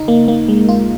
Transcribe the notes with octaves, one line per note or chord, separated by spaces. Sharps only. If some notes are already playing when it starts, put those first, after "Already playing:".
Already playing: D#2 C#3 D#4
A#3
A#3
G#3
F4